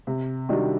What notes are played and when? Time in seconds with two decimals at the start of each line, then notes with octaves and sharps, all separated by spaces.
0.07 C3
0.49 D#3 G3 D4 F#4